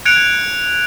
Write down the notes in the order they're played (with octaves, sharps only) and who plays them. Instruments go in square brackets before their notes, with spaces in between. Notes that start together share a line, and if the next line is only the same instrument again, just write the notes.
[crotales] F#6 G#6 C#7 D7 F7